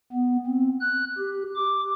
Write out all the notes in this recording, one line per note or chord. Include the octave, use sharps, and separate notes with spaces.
B3
C4
F#6
G4
D6